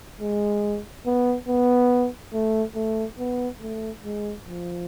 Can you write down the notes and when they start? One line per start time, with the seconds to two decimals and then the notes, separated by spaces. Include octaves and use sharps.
0.20 G#3
1.06 B3
1.48 B3
2.33 A3
2.75 A3
3.18 B3
3.61 A3
4.04 G#3
4.46 F3